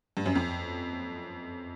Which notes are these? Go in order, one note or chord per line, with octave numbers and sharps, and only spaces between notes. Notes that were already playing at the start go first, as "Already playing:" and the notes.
G2
F#2
F2